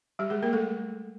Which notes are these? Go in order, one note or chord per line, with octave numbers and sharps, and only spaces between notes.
G3 G4
G#3 G#4
A#3 A#4
A3 A4